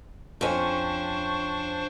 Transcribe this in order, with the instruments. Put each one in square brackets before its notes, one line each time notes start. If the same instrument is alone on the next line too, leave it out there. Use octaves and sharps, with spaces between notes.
[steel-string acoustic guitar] F2 C#4 [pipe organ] D4 C5 C#6